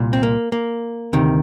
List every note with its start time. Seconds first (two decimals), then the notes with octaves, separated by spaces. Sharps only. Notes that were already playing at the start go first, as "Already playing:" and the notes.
Already playing: C2 A#2
0.13 C4
0.23 A#3
0.52 A#3
1.13 D2 C3 D#3